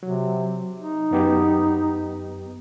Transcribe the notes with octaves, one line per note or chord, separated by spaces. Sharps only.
C3 F#3
D#4
F#2 B3 G4